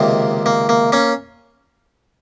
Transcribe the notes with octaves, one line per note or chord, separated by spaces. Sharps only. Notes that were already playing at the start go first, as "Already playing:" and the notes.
Already playing: C#2 C3 D#3 A#3
A#3
A#3
A#3 C#4